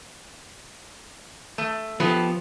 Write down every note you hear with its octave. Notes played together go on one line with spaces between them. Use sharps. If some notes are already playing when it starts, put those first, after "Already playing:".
A3
F3 B3 G4 A4